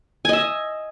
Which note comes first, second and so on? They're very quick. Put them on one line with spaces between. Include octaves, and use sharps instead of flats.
G#5 D#5 E5